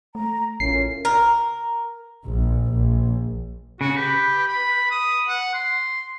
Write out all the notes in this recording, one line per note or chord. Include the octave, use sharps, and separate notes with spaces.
A3 A#5
A1 A2 C#4 F4 A#4 C7
A#4
A#1
A#1
C#3 F#4
G4 B4
B5
D#6
F#5
C6